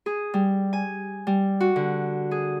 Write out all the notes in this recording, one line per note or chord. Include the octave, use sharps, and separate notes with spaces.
G#4
G3
G#5
G3
F#4
D3
G#4